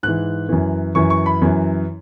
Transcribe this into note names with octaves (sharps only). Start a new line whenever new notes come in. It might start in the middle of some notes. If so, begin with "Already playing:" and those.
G#2 E3 F#6
F#2 E3
F#2 E3 C#6
C#6
B5
F#2 E3